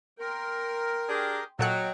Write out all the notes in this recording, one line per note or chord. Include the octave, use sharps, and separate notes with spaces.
A#4 G5 C6
D4 G4 G#4
A#2 F#3 A4 D#5 F#5 G5